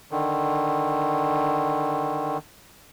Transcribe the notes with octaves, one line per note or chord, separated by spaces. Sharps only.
D3 D#3